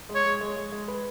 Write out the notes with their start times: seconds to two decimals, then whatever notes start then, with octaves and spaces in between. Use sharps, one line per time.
0.09 G#3
0.15 C#5
0.25 G#3
0.41 G#3
0.56 G#3
0.72 G#3
0.88 B4